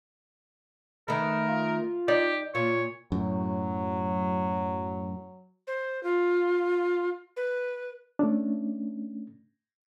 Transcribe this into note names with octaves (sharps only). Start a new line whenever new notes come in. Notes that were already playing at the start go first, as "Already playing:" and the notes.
D#3 A3 A#4 B4
F4
D#4 G4 D5
A#2 F4 C#5
F#2 A2 F#3
C5
F4
B4
A3 C#4 D4